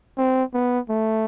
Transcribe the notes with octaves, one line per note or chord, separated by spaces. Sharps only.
C4
B3
A3